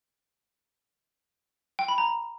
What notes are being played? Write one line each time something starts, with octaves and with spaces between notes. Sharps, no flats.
G5
B5
A#5